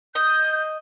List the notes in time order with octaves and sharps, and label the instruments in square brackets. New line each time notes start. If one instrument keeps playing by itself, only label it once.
[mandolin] D#5 [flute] G6